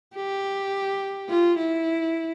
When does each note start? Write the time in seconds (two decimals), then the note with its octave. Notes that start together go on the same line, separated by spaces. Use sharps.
0.15 G4
1.29 F4
1.58 E4